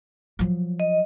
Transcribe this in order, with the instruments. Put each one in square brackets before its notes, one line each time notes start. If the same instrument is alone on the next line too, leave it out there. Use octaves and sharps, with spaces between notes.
[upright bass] F3 F#3
[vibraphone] D#5